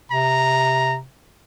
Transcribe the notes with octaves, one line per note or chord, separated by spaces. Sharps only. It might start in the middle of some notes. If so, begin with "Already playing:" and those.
C3 A#5